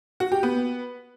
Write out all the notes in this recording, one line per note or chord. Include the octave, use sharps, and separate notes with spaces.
F#4
G4
B3